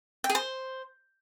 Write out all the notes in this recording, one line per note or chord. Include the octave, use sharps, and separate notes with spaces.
G5
G#4
C5